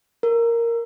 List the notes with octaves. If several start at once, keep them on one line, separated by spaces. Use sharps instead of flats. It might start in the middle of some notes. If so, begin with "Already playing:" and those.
A#4